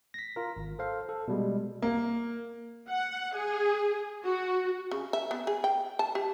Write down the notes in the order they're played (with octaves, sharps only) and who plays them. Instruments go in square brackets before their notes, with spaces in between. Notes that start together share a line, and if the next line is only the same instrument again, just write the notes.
[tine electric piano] A#6 B6
F4 A#4
G#1
A4 C5 F5
A4
B2 G3 G#3
[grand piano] A#3
[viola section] F#5
G#4
F#4
[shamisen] C#3
E5
B3
G#4
G5
A5
G4